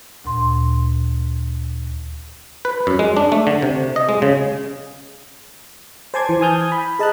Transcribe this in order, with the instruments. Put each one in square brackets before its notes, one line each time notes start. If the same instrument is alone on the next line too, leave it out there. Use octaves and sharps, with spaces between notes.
[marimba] D2 A#2 C6
[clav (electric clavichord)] B4
F#2
G#3
D4
A3
D3
C3
D#5
G#3
C#3
[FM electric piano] C5 G#5 A5 C6 D6 G#6
E3
G#5 A5 D#6 F6 G6 G#6
B5
G#4 D#5 A5 A#5 F#6